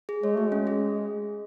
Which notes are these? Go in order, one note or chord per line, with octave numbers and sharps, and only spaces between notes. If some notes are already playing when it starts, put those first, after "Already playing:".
G#4
G#3 C#5
A3 F#4
G#3 C#4
G#4